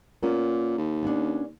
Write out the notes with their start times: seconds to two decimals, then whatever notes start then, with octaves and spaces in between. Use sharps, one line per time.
0.23 A#2 A#3 B3 C#4
0.78 D#2
1.03 B3 C#4 D4